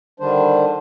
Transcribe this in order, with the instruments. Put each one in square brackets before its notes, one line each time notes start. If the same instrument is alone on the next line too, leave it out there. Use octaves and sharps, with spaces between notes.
[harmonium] D3 D#3 G3 D4 C5